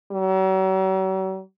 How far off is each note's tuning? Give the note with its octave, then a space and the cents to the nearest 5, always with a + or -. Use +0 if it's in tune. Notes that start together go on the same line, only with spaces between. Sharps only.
F#3 +45